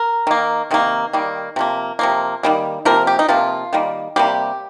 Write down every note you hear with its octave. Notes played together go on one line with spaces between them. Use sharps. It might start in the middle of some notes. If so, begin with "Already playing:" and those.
Already playing: A#4
D#3 A#3
C3 D#3 A#3
D#3 G3 A#3
C3 F3 A#3
C3 F3 A#3
D#3 G3 A#3
C3 F3 A#3 A#4
G4
D#4
C3 F3 A#3 F4
D#3 G3 A#3
C3 G3 A#3 G4